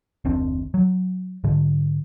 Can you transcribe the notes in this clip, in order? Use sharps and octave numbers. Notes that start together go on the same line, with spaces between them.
F#1 D#2 C4 D4
F#3
G#2 D3